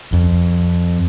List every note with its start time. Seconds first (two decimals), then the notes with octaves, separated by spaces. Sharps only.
0.13 F2